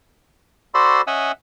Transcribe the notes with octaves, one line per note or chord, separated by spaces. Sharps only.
F#4 A4 C5 D5 B5 C6
C#4 D#5 E5 F#5 G#5 E6